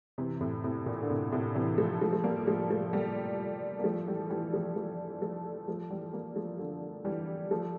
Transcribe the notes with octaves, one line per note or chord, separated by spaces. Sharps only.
C3 E3
A2 C3
A2 C3
A#2
D3
A2 C3
A2 C3
C3 E3
F3 A3
F3 A3
A3
G3 A#3
F3 A3
F3 A3
G3 A#3
A#3
F3 A3
E3 G3
E3 G3
F3 A3
F3 A3
F3 A3
F3 A3
E3 G3
G3 A#3
F3 A3
D3 F3
E3 G3
F3 A3